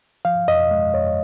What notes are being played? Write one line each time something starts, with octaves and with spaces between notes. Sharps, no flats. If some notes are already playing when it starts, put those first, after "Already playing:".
F3 F5
F2 D#5
G#3
F2 C#5